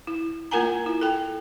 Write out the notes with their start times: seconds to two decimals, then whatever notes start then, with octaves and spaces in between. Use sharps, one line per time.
0.07 E4
0.51 A#3 F4 A#4 F#5 G#5 A#5
0.86 E4
1.01 A4 G5